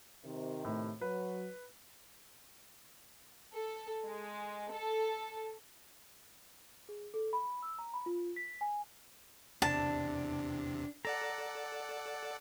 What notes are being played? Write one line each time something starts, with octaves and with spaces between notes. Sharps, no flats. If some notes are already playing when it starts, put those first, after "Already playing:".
C3 D#3
A2
F#3 B4
A4
G#3
A4
G#4
A4
B5
E6
A#5
B5
F4
B6
G#5
E2 C3 D4 A5
A4 D5 F#5 A#5